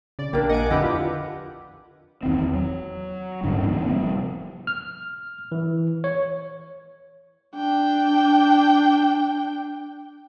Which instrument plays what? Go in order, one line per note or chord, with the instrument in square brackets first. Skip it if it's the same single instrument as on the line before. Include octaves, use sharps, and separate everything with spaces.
[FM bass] C#3 [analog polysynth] D5
[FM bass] A#1 [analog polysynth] A#3 D4 [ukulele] G4 A#4
[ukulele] D#5 [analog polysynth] F#5 G#5 D6
[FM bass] F2 [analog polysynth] D3 G4 B4 [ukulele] E4 D#5 F#5
[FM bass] F4
[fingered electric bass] E2 D#3 C4
F#3
D1 G2 D3 C#4
E3 A#3 B3 C#4
C3 F3 G3
[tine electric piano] F6
E3
C#5
[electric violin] D4 G5